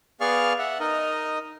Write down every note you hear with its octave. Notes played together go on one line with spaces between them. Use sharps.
B3 G#4 D5 F5 C#6 F6
E5 F#5
D#4 A#4 D#5